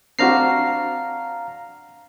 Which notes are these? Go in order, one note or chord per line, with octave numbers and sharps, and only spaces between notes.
C4 D4 F#4 F5 A#5 C7